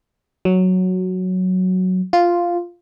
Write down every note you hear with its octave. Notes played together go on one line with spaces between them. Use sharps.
F#3
F4